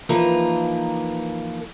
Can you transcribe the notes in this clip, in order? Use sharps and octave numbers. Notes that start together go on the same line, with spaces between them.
E3 F3 A#3 D#4 A#4 B4